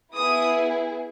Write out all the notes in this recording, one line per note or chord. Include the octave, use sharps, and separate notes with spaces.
B3 E4 G#4 D#6